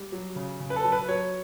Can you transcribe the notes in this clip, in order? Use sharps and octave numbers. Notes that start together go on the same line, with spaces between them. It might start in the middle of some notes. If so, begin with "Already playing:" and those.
Already playing: G3
F#3
C#3
C#3
B4
A4
F#3
B4
F#3 C#5